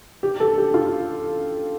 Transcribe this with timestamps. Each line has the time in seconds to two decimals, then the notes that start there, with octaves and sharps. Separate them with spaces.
0.23 G4
0.40 A4
0.58 G4
0.74 F4